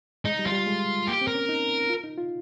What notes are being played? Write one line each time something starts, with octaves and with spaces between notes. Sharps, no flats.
G#3 D#4
G3
F4
G3
G#3
A#3 G4
C4
A#4
C#4
D#4
F4
D#4
F4